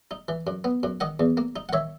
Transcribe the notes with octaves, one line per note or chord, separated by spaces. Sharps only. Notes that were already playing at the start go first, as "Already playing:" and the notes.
D#4
E3
F#2
B3
F#2
D#3 D#5 F#5
E2
A#3
D#4
F#5
D#3 C#5 E5